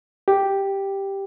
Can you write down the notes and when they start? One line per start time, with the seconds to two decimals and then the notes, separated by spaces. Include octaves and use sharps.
0.28 G4